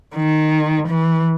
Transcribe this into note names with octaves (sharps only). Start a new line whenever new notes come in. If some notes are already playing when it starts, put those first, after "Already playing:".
D#3
E3